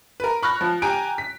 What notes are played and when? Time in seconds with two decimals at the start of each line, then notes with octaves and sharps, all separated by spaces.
0.20 A#4 B4
0.43 B5 C#6 F6 F#6 A#6
0.61 F3
0.82 G4 G#5 A#5 D7
1.18 B6